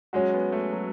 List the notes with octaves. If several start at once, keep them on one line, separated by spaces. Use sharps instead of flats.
F#3 G#3 C#4 F#4
B3
A3
F#3